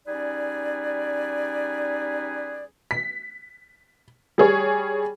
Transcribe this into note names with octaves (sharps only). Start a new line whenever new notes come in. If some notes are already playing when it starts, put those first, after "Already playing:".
G3 C#4 D#4 G#4 B4 D5
B6
G3 G#4 C#5